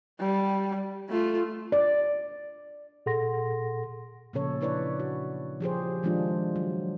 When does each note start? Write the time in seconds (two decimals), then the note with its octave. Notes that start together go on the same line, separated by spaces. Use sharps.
0.20 G3
1.09 A3 F4
1.72 D5
3.06 A#2 G#4 A4 F#5 C6 A#6
4.33 A#2 C#3 F3 C#4 A4 C#5
4.61 D4 E4 B4 C#5 D5
5.00 F#4
5.61 F3 G4 G#4 C5
6.03 D#3 F3 G#3 D4 F4
6.56 F#3